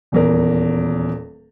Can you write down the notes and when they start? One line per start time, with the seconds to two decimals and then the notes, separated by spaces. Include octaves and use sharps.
0.12 D#1 E2 A#4